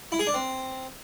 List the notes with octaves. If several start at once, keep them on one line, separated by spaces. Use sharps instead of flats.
E4
G#4
D4
C4